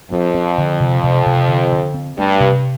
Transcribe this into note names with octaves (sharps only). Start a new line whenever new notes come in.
F2 C4
C4
D3
C3
C3
C3
D3
D3
C4
G2 A3
C3